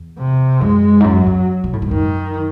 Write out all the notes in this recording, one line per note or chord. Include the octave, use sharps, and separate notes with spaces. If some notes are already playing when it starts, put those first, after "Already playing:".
Already playing: E2
C3
F#2 G#3
G#2
F#2 F#3
F#2
C3
A2
G#2
F#2 D#3